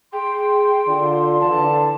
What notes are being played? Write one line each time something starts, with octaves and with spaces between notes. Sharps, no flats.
G#4 G5 C6
D3 F4 D5
D3 E3 A5